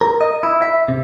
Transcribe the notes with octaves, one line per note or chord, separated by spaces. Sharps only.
A#4
D#5
E4
E5
C3